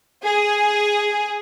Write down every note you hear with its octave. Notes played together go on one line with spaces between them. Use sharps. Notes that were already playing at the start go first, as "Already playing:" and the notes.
G#4